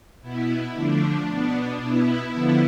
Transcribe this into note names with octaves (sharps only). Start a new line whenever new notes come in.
B2 B3 E4
D3 F3 A3 D4
B2 B3
B2 B3 E4
D3 F3 B3